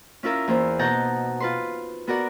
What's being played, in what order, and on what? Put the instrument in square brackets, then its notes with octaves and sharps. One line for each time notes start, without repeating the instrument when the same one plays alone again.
[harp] C#4 E4 F4 A#4 E5
E2 A#3 C5
B2 D#4 F#5 A5 A#5 G6
F4 B4 C6
B3 F#4 A#4 D5 F#5